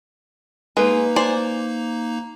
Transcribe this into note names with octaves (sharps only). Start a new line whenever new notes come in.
G#3 A#3 D#4 B4 A#5
C5 D5 G#5